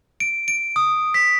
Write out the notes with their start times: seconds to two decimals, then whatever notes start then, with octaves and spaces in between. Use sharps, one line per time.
0.20 D7
0.48 D7
0.76 D#6
1.14 B6